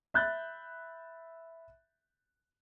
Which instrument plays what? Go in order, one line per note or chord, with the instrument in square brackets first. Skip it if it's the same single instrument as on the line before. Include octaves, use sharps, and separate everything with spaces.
[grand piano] E5 B5 F#6 G6 A6